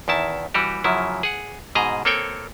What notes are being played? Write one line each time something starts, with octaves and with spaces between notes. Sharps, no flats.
E2 D#3 E4 A5
E3 G3 F#4 G4
F#2 C#3 F3 F#3 E4
G#4 F#5
G#2 B2 G#4 D#5 A#5
A#3 C4 A4 C#5 G5